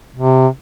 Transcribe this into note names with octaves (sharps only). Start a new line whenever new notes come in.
C3